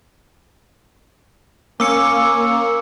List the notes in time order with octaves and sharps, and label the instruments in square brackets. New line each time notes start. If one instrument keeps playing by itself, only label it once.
[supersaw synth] A#3 [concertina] C#4 [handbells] A#4 [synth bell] D6 E6 C#7